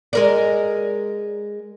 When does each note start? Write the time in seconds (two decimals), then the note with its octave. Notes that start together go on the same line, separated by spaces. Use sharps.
0.13 G#3 A#4 D5